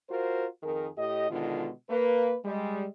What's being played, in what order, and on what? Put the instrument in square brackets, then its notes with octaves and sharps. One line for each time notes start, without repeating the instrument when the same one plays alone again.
[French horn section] F4 F#4 A#4 C5
F2 D#3 G#4 A#4
A2 G4 D#5
B2 D3 D#3 G#3 F4
A#3 B4
G3 G#3